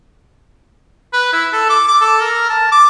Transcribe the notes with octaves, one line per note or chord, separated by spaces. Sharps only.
B4
E4
A4
D6
D6
A4
A#4
A5
D6